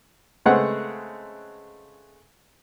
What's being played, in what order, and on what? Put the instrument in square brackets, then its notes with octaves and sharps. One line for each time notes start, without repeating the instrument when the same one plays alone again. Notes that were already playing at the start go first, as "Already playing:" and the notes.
[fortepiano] C#3 G#3 A3 C4 B4 F#5